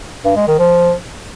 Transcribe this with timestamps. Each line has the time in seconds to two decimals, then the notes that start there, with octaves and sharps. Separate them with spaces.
0.25 G2
0.36 G#3
0.48 D#3
0.59 F3